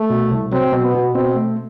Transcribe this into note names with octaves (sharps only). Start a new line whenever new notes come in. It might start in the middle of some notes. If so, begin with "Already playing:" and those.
Already playing: A3
B2
C2
F#3 C4
B2
B3
B2
B2 C4
A3